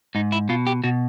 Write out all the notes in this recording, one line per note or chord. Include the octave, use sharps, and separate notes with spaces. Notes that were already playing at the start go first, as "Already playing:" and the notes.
G#2 D#4
E4
B2 F4
G4
B2 F#4